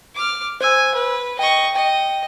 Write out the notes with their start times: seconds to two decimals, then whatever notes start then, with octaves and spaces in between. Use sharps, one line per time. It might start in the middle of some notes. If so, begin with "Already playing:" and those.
0.15 D6 F6
0.61 C5 G#5 E6
0.95 B4
1.39 D#5 G5 C#6
1.75 D#5 G5